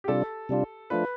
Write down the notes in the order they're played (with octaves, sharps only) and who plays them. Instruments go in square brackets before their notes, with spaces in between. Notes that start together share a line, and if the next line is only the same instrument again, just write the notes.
[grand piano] G4
[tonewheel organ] C3 G3 D4 F4 [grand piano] A4
[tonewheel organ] C3 G3 D4 F4
[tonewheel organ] F3 A3 D4 F4 [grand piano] B4